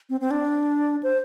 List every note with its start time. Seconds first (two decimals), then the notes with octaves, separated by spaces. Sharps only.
0.09 C4
0.20 C4
0.31 D4
1.03 C5